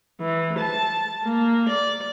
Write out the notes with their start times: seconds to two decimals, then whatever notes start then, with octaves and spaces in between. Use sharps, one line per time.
0.21 E3
0.59 A5
1.24 A#3
1.69 D5